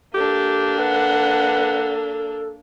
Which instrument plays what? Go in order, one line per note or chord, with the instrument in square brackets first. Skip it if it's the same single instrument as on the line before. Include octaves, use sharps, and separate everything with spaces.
[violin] A#3 D4 [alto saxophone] G4 [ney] A4
[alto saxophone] B4 [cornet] F#5